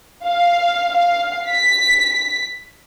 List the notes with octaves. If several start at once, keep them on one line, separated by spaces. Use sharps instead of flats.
F5
F5
B6